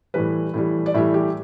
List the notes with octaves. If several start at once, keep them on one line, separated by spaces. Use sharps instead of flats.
A2 E3 G3 B4
A2 E3 G3
D5
A2 E3 G3 E5
G4